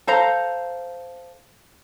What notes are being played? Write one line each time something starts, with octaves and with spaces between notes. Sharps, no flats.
A4 C5 F5 A#5